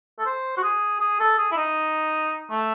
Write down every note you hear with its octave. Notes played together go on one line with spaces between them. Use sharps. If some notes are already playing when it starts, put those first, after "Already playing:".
A4
C5
F#4
G#4
G#4
A4
G#4
E4
D#4
A3